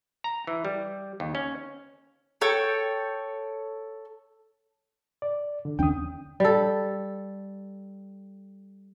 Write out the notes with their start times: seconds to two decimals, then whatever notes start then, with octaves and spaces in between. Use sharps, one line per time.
0.24 A#5
0.47 E3
0.65 G3
1.20 D#2
1.35 C#4
2.41 A4 C#5 G5
5.22 D5
5.65 D3
5.79 D#2 C#4 D4 G5 D#6
6.40 G3 A4